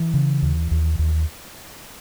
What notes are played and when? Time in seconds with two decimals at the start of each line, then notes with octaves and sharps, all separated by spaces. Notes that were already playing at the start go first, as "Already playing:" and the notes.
Already playing: E3
0.14 C#3
0.42 D#2
0.71 D#2
0.99 D#2